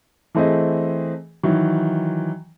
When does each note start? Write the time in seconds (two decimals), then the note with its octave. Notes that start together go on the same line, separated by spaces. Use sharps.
0.35 E3 A3 C4 G#4 D#5
1.43 D#3 E3 F#3